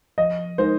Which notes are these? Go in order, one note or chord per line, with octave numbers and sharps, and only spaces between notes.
F3 D#5
G#3 D#4 A#4 C5